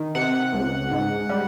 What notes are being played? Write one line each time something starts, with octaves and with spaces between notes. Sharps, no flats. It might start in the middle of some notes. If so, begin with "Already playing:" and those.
Already playing: D#3
C3 F#5
C#2
G#2
G3